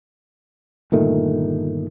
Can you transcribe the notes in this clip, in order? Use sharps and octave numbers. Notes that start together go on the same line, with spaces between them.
G1 A#2 D#3 A3